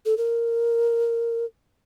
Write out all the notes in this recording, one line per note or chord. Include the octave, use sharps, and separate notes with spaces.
A4
A#4